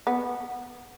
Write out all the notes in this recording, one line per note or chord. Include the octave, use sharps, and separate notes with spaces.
B3